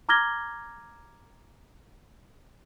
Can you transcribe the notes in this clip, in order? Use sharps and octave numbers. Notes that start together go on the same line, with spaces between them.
A#5 D6 F6 G#6 A#6 G7